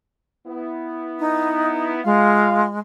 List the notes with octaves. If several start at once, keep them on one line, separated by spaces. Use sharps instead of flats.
B3 E4
D#4
G#3 F4 F5